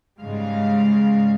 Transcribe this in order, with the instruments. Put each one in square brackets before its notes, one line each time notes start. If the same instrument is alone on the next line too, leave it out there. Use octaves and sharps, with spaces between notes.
[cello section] G#2 C#3 G3 G#3 F5